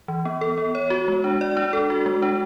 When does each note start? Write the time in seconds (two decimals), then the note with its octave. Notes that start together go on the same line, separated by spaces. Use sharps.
0.08 E3
0.25 B3
0.41 A4
0.58 B3
0.75 C#5
0.90 F#4
1.08 G#3
1.24 D4
1.41 D5
1.57 D4
1.73 A4
1.90 F#4
2.06 G#3
2.22 D4